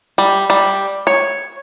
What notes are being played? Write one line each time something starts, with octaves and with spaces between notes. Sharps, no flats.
G3
G3
C#5